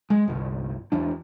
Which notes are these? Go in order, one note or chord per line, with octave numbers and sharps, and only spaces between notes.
G#3
G1 C2
E2 E3 D4